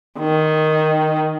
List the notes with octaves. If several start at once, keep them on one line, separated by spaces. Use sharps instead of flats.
D#3